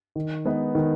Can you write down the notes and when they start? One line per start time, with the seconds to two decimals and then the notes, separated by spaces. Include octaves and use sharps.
0.16 D#3
0.45 G#3 B3 D#4 B4
0.75 D#3